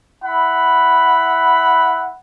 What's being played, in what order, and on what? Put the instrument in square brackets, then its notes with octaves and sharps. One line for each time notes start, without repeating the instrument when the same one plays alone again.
[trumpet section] E4 F#5 B5